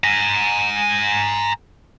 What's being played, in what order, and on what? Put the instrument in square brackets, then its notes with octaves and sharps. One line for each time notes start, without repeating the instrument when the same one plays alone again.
[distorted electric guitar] G#5 A#5